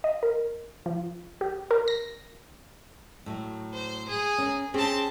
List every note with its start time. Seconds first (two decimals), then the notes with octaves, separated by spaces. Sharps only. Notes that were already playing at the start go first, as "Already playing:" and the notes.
0.04 D#5
0.23 A#4
0.86 F3
1.41 G4
1.71 A#4
1.88 A#6
3.26 A2 F#3
3.74 C5
4.08 G#4
4.38 C#4 A#4
4.74 C4 C#4 G4 G#4 A5